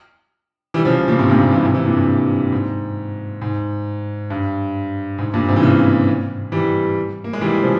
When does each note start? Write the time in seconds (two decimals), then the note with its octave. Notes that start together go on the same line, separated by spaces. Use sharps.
0.74 E3 G3
0.85 C#3 F3
1.08 A#2 C#3
1.19 G#2 C3
1.29 G2 A#2
1.41 G#2 C3
1.52 C3 E3
1.63 G#2 C3
1.74 C3 E3
1.85 G2 A#2
1.97 G2
2.52 G#2
3.42 G#2
4.30 G2
5.18 G#2
5.34 G2 A#2
5.48 G#2 C3
5.56 E3
5.63 A#2 C#3
6.52 E3 G3
7.24 A#3
7.33 G#3
7.41 E3 G3
7.62 C#3 F3